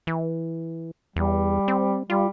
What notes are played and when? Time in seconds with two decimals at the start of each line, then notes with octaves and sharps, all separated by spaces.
0.07 E3
1.16 E2 G3
1.68 C4
2.10 G3 F4